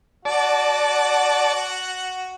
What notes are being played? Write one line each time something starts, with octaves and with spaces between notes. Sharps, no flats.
F#4 D5 F#5 A5